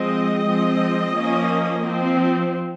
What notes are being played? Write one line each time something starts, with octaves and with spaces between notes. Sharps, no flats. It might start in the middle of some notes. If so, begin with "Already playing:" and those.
Already playing: F3 G#3 C4 D#5
F3 G#3 C4
F3 A#3 C#4
F3 C4